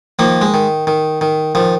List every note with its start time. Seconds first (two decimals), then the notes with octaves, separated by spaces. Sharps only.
0.19 D#3 F3 A#3
0.41 G#3
0.54 D#3
0.87 D#3
1.21 D#3
1.55 D#3 F3